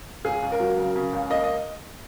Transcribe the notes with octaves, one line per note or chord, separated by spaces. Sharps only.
C#2 G#4
C#2
A#4
F#3
C#3 A#4
C#3
C#2
A#3 D#5
D#5